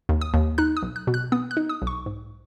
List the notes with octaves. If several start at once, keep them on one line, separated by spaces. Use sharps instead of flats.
D#2
D#6
D#2
D#4 F#6
D#6
B1
F#6
B2
F#6
B3 D#6
F#6
D#4
D#6
B1
C#6
G#2